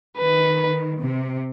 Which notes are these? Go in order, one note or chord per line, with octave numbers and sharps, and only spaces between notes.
D#3 B4
C3